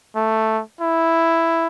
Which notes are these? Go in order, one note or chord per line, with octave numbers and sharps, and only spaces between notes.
A3
E4